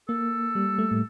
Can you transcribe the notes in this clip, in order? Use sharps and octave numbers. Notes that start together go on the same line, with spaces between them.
A#3 A4
G3
A3
A2